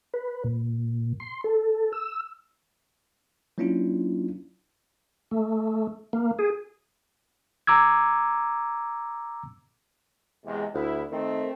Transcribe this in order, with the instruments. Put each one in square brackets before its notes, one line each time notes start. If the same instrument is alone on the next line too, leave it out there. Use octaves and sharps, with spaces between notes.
[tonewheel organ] B4
A#2
C6
A4
E6
[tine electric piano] F#3 A#3 C#4 D4 E4 F4
[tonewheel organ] A3
A#3
G#4
[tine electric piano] A#5 D6 E6 G#6
[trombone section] E2 C3 G#3
[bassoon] D2 [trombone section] E4
[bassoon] D#3 [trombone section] A3 C4